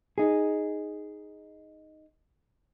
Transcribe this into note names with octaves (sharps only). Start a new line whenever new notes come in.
D#4 G#4